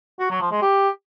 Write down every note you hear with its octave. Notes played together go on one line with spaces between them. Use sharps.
F#4
F#3
F3
G#3
G4